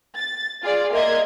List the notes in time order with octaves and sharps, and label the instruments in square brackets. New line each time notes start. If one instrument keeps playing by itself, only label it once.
[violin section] A6
F4 G#4 D5
A#3 A#4 D#5 E5 C6 G#6